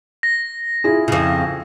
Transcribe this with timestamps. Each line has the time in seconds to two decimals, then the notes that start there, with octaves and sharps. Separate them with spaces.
0.23 A#6
0.84 E4 F4 G#4
1.08 F2 C#3